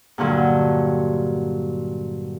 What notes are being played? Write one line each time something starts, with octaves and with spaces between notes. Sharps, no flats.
G2 A#2 D3 F#3